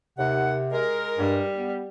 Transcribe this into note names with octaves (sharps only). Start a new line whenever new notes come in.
D#2 C3 F#5
G#3 A#4
G2 G3
B3